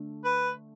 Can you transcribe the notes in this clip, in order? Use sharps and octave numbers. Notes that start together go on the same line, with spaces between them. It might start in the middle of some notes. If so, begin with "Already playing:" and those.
Already playing: D3 A3 D4
B4